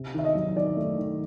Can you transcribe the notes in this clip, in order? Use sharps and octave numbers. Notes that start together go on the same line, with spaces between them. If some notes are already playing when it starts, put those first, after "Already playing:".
Already playing: C3
D#3 E5
D#5
F#3
D#3 D5
A3
D#3